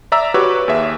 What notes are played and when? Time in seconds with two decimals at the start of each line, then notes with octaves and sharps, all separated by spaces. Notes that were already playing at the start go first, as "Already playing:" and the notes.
0.12 D5 E5 A#5 E6
0.34 F#4 G4 B4 C#5 D6 E6
0.68 D#2 G#4 E5